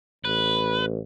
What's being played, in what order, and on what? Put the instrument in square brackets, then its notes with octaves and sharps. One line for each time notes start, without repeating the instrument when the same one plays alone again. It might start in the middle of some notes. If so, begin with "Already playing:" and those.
[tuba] A1 [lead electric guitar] B4